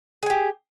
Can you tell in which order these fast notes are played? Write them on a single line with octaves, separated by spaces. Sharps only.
G#4 G#5 G4